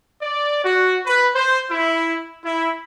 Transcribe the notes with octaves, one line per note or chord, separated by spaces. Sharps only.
D5
F#4
B4
C5
E4
E4